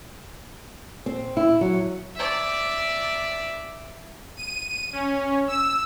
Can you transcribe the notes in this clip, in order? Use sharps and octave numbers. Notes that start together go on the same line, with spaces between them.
C4
E4
F#3
D5 E5
D#7
C#4
E6